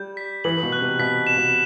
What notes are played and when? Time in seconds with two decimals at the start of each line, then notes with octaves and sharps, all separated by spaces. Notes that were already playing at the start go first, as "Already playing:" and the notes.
Already playing: G3 G6
0.17 B6
0.44 E3 F#7
0.63 B2
0.72 F#6
0.81 C3
0.99 B2 B6
1.27 E7
1.36 B2